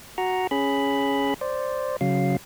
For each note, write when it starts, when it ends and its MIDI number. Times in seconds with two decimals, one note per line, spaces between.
0.18 0.47 66
0.18 0.47 78
0.18 0.47 82
0.51 1.34 61
0.51 1.34 68
0.51 1.34 83
1.41 1.96 72
1.41 1.96 74
2.01 2.37 49
2.01 2.37 54
2.01 2.37 77